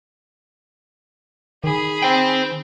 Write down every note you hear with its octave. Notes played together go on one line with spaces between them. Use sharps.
D#3 G#4 B5
C5 G5